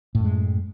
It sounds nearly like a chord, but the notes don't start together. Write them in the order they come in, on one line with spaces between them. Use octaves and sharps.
A2 F#2 G#3